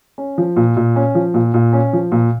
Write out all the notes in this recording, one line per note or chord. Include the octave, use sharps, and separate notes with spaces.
C#4
F3
A#2
A#2
C#4
F3
A#2
A#2
C#4
F3
A#2